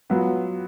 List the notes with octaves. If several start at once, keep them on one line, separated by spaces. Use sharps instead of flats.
F#3 B3 F4